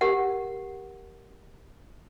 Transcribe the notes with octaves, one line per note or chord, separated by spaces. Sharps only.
G4 A#4 F#5